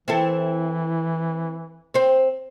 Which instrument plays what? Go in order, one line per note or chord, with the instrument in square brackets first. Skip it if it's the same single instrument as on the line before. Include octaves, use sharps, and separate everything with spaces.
[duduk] E3 [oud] C4 E4 A4
[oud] C4 C5